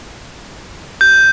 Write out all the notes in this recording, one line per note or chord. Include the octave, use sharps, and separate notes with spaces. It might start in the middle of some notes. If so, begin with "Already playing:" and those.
G6